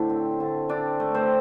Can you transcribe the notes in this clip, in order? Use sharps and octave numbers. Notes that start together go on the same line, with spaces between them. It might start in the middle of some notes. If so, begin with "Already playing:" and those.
Already playing: A2 D3 A3 C5
C4
D3
C4 D4 D5
A3
C4 C5